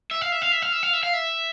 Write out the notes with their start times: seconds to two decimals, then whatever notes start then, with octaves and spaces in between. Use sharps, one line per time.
0.11 E5
0.21 F5
0.32 E5
0.42 F5
0.52 E5
0.62 F5
0.72 E5
0.83 F5
0.93 E5
1.03 F5
1.14 E5